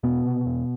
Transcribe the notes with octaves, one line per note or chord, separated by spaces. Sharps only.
E2 B2 B3
C3
E2